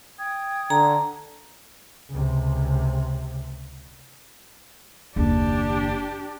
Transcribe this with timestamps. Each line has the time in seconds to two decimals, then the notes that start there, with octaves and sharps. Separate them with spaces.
0.18 G5 D#6 G#6
0.70 D3 A#5
2.10 C#2 C3
5.16 F#1 D#2 D4 G4